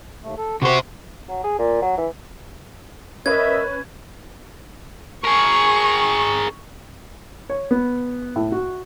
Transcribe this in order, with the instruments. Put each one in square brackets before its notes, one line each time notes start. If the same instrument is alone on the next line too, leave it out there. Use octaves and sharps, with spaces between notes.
[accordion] D#2 A3
A4
[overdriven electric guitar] C3 C5 [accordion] F#4
[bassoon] F#3
G#4
A#2
F#3
E3
[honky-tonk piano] C#4 B4 [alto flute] A#4 [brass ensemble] D#5 E5 [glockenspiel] G#6
[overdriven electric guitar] G#4 A#4 [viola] C#6
[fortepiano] C#5
B3
A2
F#4